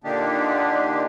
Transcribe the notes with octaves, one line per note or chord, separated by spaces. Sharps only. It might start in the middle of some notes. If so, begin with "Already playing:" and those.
A#2 D3 A#3 D4 D#4 G4